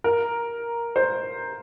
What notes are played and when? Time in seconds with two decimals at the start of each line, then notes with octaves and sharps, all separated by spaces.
0.04 A#4
0.96 C5